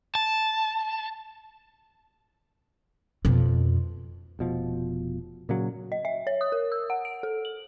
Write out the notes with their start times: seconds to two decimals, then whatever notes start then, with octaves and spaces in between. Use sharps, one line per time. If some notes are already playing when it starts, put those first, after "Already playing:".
0.15 A5
3.25 F2 B2
4.39 F1 B2 F3
5.49 A#2 C#3 F#3
5.92 D#5
6.05 E5
6.27 C#5
6.41 D#6
6.52 A#4
6.72 E6
6.90 F#5
7.05 D7
7.23 A4
7.45 F#7